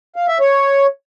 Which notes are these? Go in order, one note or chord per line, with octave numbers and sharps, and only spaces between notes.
F5
E5
C#5